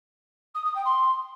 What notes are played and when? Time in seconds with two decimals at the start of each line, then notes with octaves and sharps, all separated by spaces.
0.55 D#6
0.65 D#6
0.75 G5
0.85 C6